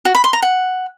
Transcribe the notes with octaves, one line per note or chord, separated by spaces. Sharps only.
F#4
B5
C6
A#5
F#5